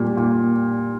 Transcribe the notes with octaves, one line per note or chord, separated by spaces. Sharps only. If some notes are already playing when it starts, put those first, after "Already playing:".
Already playing: A#2 G3
A#2